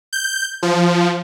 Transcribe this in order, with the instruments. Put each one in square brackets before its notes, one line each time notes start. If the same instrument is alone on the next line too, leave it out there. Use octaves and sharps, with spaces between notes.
[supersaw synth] G6
F3